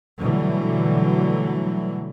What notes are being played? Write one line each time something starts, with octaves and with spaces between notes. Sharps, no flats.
B2 D3 E3 F#3 G3 A3